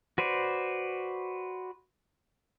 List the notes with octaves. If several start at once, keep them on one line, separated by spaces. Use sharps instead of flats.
F#4 B4 C5 D5